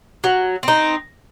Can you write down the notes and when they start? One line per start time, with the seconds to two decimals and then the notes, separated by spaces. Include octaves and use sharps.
0.24 F#3
0.63 C4 D#4